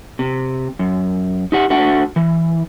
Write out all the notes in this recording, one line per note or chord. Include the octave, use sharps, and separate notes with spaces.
C3
F#2
D#4 G4 F#5
A3 D4 F#4 F#5
E3